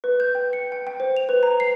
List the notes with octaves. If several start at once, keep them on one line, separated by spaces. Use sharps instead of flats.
B4
G6
G5
C#7
G5
G5
C5
F7
B4
A#5
C7